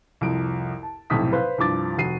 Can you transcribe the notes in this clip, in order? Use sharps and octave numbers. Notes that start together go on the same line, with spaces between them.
C2 F2 D7
A5
F1 B1 A2 C3 D#6 B6
B4 C5 F5
C2 G2 F3 D6 A6
F1 F#4 C7 D#7